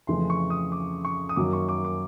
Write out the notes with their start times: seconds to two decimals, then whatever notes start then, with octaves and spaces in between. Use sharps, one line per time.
0.07 F2 C#3 E3 A3 C6
0.30 C#6
0.50 D#6
0.72 D6
1.05 C#6
1.29 D#6
1.36 F#2 D#3 F#3 A#3 D6
1.53 C#6
1.69 D6
1.85 D6